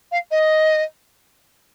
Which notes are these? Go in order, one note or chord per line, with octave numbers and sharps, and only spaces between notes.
F5
D#5